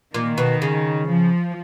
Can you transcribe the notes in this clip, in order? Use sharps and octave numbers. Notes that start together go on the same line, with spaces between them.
A#2 D#3
B2
C#3
F3